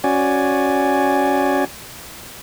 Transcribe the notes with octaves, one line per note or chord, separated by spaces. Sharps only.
C#4 F#4 D5 G#5